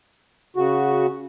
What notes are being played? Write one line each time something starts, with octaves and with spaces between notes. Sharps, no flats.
C#3 F#4